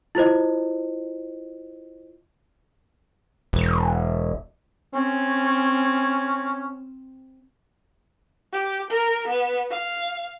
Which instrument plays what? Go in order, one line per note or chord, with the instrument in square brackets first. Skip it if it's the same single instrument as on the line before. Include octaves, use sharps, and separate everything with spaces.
[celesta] E4 F4 C5 D#5
[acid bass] E1
[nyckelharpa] C4 [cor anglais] C#4
[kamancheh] G4
A#4
B3
F5